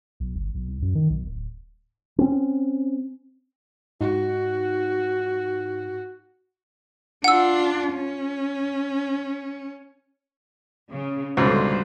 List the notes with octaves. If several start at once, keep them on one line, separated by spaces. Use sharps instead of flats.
B1
G1
B1
C2
F#2
D#3
B1
D1
C4 C#4
G#2 D#4 F#4
D4 F4 F#5 E6
C#4
C#3
C#2 G#2 B2 D3 G3 C5